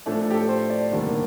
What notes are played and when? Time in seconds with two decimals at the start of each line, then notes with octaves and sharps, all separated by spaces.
0.06 A2 F3 A3 D4 A4
0.21 A4
0.31 G4
0.34 A4
0.49 C5
0.70 D5
0.91 F1 D#2 D3 G3 A#3